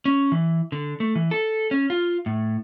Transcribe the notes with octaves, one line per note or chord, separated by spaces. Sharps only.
C#4
E3
D3
A3
E3
A4
C#4
F4
A2